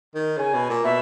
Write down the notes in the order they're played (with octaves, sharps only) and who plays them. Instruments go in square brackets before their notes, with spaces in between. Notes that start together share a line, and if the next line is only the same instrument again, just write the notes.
[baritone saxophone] D#3
[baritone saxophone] C#3 [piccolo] G#5
[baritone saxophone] B2
A#2
[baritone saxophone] B2 [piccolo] E5